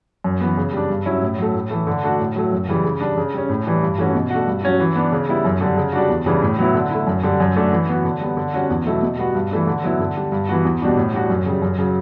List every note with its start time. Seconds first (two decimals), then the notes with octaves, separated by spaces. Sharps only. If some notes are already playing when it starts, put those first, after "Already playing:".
0.24 F#2
0.41 E3 B3
0.57 C#3
0.73 G3 D4
0.90 G2
1.06 F#3 C#4 E4
1.23 A2
1.38 F#3 A3
1.55 A2
1.70 E3 A3
1.87 D3
2.03 A3 D4 F#4
2.20 A2
2.36 F#3 A3
2.52 F#2
2.69 C#3 E3 G3
2.84 C#3
3.01 G3 D4
3.17 C#3
3.34 G3 C#4
3.49 A2
3.66 E3 G3 D4
3.82 G2
3.98 E3 A3 C#4 F#4
4.15 B2
4.31 A3 D4 F#4
4.47 G2
4.63 F#3 C#4 F#4
4.80 E3
4.96 B3 D4
5.12 C#3
5.29 G3 B3 E4
5.45 F#2
5.61 D3 G3
5.77 C#3
5.93 G3 D4 F#4
6.10 E2
6.26 C#3 E3 G3 D4
6.42 A2
6.59 F#3 B3 E4
6.74 D3
6.90 A3 E4
7.07 F#2
7.23 D3 G3
7.40 F#2
7.56 D3 A3 D4 F#4
7.72 E3
7.89 B3 F#4
8.05 D3
8.21 G3 B3
8.37 D3
8.54 G3 C#4 F#4
8.70 E2
8.86 B2 F#3 A3 E4
9.02 B2
9.18 G3 B3 F#4
9.35 G2
9.51 E3 A3 D4
9.67 D3
9.84 F#3 B3 E4
10.00 D3
10.16 G3 D4
10.32 G2
10.49 E3 B3 F#4
10.65 E2
10.81 B2 G3 D4 F#4
10.97 A2
11.13 G3 D4 F#4
11.30 F#2
11.46 C#3 G3
11.62 F#2
11.78 C#3 F#3